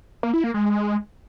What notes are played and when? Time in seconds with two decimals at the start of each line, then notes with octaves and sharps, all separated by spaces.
0.23 A#3
0.34 E4
0.44 A#3
0.54 G#3